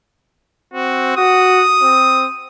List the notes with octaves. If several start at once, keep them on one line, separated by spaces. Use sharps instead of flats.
C4 F#4
F#4 D#6
C4